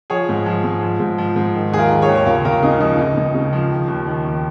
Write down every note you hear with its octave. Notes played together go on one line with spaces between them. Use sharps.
F3 G#4 C#5
G#2
F3
G#2
F3
G#2
F3
G#2
D#3
D#2 G#4
F4 A#4
D#3
G#4 C#5
D#2
C#5
C#2 F4 A#4
C#2 F4 A#4
C#3 D#4 G#4
F3 D#4
C#2 D#4
C#2
C#3
F3
D#3
D#2
D#3
D#2